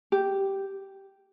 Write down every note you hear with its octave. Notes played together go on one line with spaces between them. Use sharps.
G4